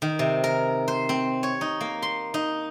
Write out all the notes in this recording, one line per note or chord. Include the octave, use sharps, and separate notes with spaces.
D#3
C3
A#4
C5
C4
C#5
D#4
A#3
C6
D#4